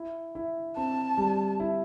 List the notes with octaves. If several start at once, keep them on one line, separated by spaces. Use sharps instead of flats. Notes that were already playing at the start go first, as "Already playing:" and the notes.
Already playing: E4
E4
C4 A5
G3
E4